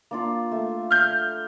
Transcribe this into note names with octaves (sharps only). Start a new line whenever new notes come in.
A#3 D4 F4
A3
F6 G6